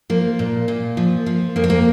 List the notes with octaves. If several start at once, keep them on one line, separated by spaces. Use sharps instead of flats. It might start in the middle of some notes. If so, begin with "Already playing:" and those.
F3 A#3
A#2
A#2
F3
F3
F2 A#3
C4
A#3